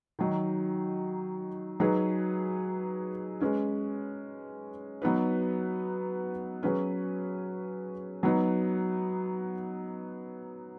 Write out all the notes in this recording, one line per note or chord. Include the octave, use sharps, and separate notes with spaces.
D#3 F#3 D#4
F#3 D#4 G#4 B4
G#3 C#4 B4
F#3 B3 D#4 B4
F#3 C#4 G#4 B4
F#3 B3 D#4